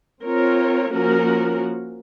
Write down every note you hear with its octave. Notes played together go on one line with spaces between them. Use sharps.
C4 F4 A#4 C#5
F3 A#3 C#4 F#4 A#4